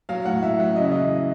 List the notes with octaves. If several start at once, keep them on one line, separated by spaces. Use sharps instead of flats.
F#3 F5
A2 F#5
A2 E5
F#3
C#3 D#5
E5
E3 D#5